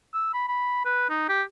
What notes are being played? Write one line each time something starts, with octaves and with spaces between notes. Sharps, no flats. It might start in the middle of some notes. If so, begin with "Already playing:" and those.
E6
B5
B5
B4
D#4
G4